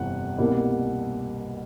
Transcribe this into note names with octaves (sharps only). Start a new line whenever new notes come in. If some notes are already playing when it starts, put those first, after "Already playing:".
Already playing: G1 F2 C3 E3 F#5
C2 B2 G3 A#3